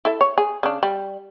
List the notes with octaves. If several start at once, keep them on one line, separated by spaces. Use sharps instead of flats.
E4 A4 E5
C#5
G#4
C#3 D4
G3